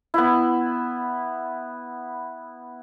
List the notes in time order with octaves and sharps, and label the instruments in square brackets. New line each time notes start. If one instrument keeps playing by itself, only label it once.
[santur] B3 E4